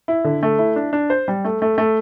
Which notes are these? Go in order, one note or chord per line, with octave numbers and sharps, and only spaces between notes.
E4
D3
A3
E4
D4
D4
C5
G3
A3
A3
A3